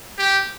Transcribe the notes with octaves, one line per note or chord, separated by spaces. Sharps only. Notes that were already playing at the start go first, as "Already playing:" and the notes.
G4